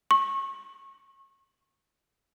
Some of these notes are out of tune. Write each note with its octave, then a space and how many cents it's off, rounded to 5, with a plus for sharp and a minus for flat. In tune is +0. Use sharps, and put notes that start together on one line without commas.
C#6 -30